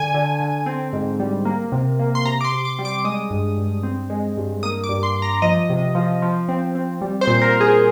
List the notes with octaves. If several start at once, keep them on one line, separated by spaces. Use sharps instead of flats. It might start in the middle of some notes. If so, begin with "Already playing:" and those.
Already playing: D3 G#5
D3
D3
C4
G#2
G3
A#3
C3
A#3
C6
C3 A#5
D6
C6
C3
D6
G3
D6
G#3 D#6
G2
G2
C4
G#3
G2
A#3 D#6
D6
G2
C6
G2
A#5
F3 D#5
C3
F3
F3
C4
C4
G3
C5
A#2
A#4
A#2
G#4